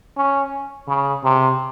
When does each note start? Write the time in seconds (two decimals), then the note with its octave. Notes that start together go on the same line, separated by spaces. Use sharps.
0.17 C#4
0.88 C#3
1.24 C3